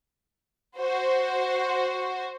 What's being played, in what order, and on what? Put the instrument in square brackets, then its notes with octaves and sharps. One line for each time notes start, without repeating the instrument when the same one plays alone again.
[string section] F#4 C5